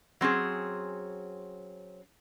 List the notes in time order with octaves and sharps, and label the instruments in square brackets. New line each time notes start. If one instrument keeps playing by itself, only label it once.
[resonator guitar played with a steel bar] F#3 C4 C#4 G#4